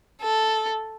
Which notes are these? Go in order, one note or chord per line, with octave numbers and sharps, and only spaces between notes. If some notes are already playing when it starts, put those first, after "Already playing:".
A4